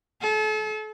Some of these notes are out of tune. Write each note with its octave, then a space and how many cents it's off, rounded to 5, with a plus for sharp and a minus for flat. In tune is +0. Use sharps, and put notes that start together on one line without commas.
A4 -35